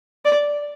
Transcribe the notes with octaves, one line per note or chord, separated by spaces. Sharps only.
D5